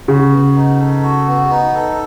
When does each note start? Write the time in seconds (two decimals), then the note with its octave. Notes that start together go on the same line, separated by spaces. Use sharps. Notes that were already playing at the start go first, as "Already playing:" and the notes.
0.08 C#3 F#4
0.32 B3
0.56 D#4
0.80 A4
1.03 F#4
1.27 B3
1.50 D#4
1.75 A4